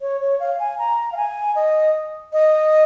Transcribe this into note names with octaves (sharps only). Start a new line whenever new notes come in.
C#5
C#5
F5
G#5
A#5
F5
G#5
D#5
D#5